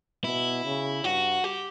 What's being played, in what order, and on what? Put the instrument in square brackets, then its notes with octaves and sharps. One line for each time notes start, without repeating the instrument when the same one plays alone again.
[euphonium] B2 [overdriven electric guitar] E4
[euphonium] C#3
[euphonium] G2 [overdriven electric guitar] F#4
[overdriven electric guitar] G4